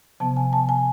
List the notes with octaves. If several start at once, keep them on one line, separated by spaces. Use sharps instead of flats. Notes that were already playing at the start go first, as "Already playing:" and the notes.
C3 F3 B3 A5
G#5
A5
G#5